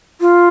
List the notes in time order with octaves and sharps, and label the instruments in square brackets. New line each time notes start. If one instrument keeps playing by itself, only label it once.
[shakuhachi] F4